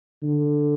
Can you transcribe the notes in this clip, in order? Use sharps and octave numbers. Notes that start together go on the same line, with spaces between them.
D3